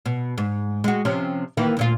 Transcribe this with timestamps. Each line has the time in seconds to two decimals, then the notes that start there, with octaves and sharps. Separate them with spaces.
0.06 B2
0.38 G#2
0.84 G#3 F#4
1.05 C3 F3 C#4
1.57 D#3 E3 A#3
1.77 D2 A#2 F4